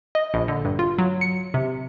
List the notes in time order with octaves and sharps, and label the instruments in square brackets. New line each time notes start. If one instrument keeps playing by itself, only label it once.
[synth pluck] D#5
A#1
D3
G2
F4
F#3
C#7
C3